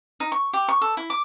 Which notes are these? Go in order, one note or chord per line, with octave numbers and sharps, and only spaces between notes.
D#4
C#6
G4
C#6
A4
E4
D6